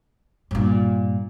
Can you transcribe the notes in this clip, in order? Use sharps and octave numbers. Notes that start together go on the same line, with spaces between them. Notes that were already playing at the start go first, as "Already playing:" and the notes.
G2 A#2